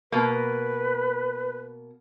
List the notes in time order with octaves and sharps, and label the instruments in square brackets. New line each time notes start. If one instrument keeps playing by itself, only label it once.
[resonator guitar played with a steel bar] B2 A#3 [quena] B4